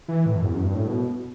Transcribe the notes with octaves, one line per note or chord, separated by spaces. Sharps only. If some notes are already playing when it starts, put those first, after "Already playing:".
E3
A2
F#2
E2
F#2
G2
A2
B2